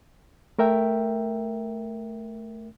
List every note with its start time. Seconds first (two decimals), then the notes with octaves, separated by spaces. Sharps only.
0.59 A3 A#4 E5 G5